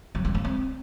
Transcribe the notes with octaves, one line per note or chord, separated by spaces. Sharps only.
F#3
G3
A#3
C4